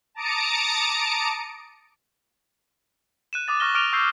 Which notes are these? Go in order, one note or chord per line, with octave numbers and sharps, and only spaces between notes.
A5 A#5 D6 D#6 C#7 D7
F#6 D#7 E7
D6 D#6 A6
C#6 F6 A#6 G7
D6 F6 D7 D#7 F7 G7
C#6 E6 G6 C7